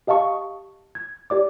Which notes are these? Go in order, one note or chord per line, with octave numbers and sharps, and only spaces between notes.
G4 D#5 F5 A5 C#6 D#6
G#6
G4 D5 D6